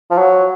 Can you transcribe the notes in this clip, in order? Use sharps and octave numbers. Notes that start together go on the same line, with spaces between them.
F3
F#3